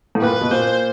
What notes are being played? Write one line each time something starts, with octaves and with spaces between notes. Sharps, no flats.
A2
A#2 B4
B2
A#2 C5